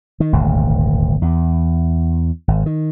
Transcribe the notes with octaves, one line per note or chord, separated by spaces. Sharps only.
D#3
D#1 G#1 D2
E2
G#1
D#3